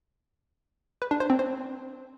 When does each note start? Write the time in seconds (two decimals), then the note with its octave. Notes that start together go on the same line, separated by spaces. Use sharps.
1.02 B4
1.11 D4
1.20 C5
1.30 C4
1.39 C5